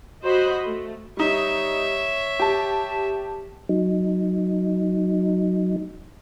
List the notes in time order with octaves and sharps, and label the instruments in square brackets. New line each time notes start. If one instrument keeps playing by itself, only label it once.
[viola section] F#4 C5 D#5 B5
A3
[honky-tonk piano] G3 D#4 [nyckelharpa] C#5 E5
[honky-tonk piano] G4 A5
[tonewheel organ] F#3 D#4